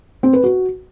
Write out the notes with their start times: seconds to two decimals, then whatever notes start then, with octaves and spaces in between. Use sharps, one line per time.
0.23 C4
0.33 B4
0.44 F#4